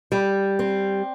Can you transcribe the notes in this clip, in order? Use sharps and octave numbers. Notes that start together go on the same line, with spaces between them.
G3
C4